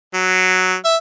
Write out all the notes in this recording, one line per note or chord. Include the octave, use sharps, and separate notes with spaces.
F#3
E5